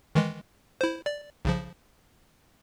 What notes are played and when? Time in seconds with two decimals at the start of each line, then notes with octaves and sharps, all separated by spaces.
0.15 D#3 E3 G#3
0.81 E4 C5
1.06 D5
1.45 B1 C#3 F3